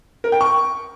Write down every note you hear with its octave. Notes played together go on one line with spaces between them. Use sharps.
A#4
G5
C#6